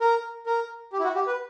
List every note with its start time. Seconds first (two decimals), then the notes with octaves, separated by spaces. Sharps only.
0.01 A#4
0.46 A#4
0.93 G4
0.99 E4
1.04 F#4
1.15 G4
1.27 B4